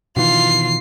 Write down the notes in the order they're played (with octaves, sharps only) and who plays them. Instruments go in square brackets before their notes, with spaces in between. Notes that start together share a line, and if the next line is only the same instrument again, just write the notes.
[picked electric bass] B2 D#3 E3 [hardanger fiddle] F4 [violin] C7